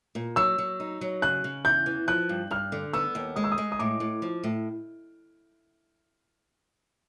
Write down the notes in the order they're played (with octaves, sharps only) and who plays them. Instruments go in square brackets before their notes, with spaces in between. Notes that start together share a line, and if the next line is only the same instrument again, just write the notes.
[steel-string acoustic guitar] A#2
[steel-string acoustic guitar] F#3 [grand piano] E6
[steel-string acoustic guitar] F#3
D#4
F#3
[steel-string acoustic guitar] C#3 [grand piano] F#6
[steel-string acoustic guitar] C#3
[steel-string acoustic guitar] E2 [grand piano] G6
[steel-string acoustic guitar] E3
[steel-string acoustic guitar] F3 [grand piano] F#6
[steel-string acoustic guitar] G2
[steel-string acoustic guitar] G2 [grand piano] F6
[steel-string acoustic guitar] D3
[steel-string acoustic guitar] B3 [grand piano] E6
[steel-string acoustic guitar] D#2
[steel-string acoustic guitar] G#3 [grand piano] D#6
[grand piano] E6
D#6
[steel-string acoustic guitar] G#3
[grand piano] D#6
[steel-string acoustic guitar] A2 [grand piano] D6
[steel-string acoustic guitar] A2
F3
A2